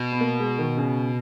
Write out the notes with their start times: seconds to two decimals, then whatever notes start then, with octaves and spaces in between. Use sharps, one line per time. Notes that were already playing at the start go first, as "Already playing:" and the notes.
Already playing: B2
0.12 B3
0.21 A#3
0.40 G#3
0.59 D#3
0.77 C#3